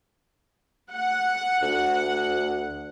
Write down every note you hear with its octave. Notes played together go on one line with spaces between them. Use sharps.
F#5
D2